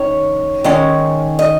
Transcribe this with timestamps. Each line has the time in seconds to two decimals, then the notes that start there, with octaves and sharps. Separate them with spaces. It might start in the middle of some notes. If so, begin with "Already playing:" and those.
Already playing: D#3 C#4 C#5
0.64 D#3 G#3 C#4
1.39 D#5